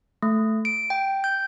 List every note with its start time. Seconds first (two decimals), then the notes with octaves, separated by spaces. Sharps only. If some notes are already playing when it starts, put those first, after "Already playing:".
0.22 A3
0.65 D7
0.90 G5
1.24 G6